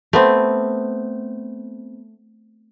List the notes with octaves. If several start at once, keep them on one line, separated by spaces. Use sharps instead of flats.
A3 B3 C4